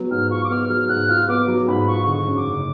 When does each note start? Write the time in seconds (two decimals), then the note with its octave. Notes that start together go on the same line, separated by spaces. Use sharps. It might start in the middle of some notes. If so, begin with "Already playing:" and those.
Already playing: F#3 B3
0.11 G#2 F6
0.31 F4 C#6
0.44 D6
0.50 B3 F6
0.70 F#3 F6
0.89 G#2 F#6
1.09 F4 F6
1.28 B3 D6
1.48 F#3
1.68 G#2 B5
1.88 F4 C#6
2.07 D3 C#6
2.27 F#2
2.37 D6
2.47 F#1